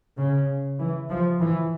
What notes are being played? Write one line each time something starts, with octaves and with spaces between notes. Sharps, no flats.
C#3
E3
F3
E3